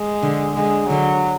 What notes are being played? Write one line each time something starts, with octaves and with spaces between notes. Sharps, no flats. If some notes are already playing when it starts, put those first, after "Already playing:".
Already playing: G#3
D3
D3 G#3
D3 F#3